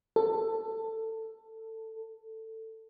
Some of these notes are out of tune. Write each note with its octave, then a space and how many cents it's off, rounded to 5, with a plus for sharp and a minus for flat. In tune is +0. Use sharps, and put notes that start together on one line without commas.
A4 +15